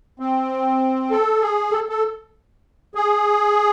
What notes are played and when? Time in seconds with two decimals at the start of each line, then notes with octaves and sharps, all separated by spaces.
0.20 C4
1.11 A4
1.42 G#4
1.72 A4
1.89 A4
2.95 G#4